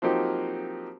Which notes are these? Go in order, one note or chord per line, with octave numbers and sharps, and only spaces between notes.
F3 F#3 A#3 C4 D#4 G4